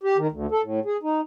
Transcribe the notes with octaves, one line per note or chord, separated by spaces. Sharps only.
G4
D#3
D2
A4
A2
G#4
D#4